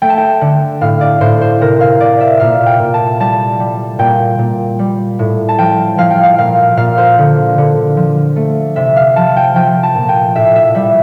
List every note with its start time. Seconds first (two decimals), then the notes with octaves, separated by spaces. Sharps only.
0.02 A3 G5
0.10 A5
0.18 G5
0.41 D3
0.81 A2 F5
1.01 D5
1.21 A2 C5
1.42 C5
1.61 C3 A#4
1.81 F5
2.01 C3 D5
2.21 E5
2.40 A#2 F5
2.66 G5
2.80 A#2
2.94 A5
3.20 G3 A5
3.60 G3
3.99 A#2 G5
4.39 A#2
4.79 G3
5.19 A2
5.49 A5
5.59 F3 G5
5.98 F3 F5
6.11 G5
6.23 F5
6.38 A#2 F5
6.77 A#2 F5
6.98 C5
7.18 D3
7.58 D3
7.97 F3
8.36 A3
8.76 C3 E5
8.96 F5
9.16 F3 A5
9.37 G5
9.56 F3 G5
9.83 A5
9.95 A#2
10.09 G5
10.35 A2 E5
10.56 E5
10.75 G3 E5